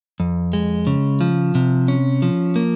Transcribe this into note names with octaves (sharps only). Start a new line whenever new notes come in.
F2
G#3
C#3
F3
C3
C#4
F3
A#3